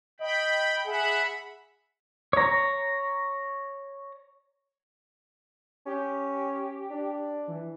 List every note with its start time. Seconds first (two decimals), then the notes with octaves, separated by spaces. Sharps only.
0.20 D#5 G5 B5
0.86 G#4 E5 F#5 B5
2.33 C#5 A#5
5.86 C#4 G4
6.91 D4
7.48 E3